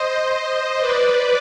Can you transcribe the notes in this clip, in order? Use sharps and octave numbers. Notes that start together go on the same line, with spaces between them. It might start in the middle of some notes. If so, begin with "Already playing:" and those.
Already playing: C5 D#5
B4 D5